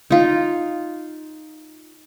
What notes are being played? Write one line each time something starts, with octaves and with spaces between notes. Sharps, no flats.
D#4 F4